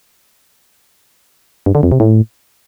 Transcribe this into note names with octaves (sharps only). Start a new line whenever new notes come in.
G2
D3
F2
C3
A2